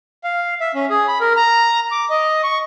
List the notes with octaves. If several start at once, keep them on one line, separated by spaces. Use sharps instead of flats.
F5
E5
C#4
G#4
B5
A#4
A#5
D6
D#5
C#6